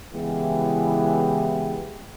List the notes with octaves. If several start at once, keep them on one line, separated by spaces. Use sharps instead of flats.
C#3 E3 G#3 B3 E4 G4